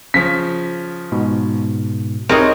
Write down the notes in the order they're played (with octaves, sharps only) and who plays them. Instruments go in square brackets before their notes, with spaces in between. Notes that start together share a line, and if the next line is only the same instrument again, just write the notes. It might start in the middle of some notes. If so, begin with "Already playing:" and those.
[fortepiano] C#3 F3 [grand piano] B6
[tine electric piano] G#2 B2
[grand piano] C2 [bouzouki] C4 C#5 D#5 [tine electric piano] D#4 G#4 [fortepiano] A#4